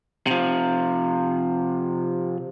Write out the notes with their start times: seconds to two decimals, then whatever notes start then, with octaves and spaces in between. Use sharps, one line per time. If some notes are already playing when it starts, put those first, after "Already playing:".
0.27 C3 F3